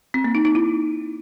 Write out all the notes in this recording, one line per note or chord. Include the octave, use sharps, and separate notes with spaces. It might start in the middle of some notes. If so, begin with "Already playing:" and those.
C4
A#3
D#4
D#4
E4